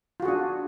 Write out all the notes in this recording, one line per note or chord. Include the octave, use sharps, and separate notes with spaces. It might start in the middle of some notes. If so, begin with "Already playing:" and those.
D4 F4 F#4 G#4